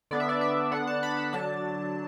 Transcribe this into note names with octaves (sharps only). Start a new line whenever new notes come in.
D3 B3 D4 D5
E5
D5
E5
D3 B3 D4 F#5
A5
B5
A5
D3 F#3 D4 A5